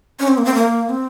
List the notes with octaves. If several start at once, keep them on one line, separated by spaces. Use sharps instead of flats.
C#4
C4
A#3
C4
A#3
C4